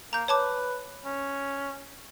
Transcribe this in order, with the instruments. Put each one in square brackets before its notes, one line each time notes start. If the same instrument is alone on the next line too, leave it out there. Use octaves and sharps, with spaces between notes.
[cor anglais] A#3 [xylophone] A#5 G6
[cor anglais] B4 [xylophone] C#5 A5 D6
[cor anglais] C#4